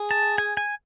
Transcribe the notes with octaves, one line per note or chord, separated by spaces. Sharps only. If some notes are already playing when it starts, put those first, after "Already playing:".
Already playing: G#4
A5
G#5
G#5